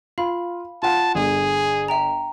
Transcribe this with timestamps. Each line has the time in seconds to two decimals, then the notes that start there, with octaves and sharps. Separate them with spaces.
0.18 F4 F5 B5
0.83 F4 F#5 A5
1.15 G1 G#4
1.88 E5 G5 A#5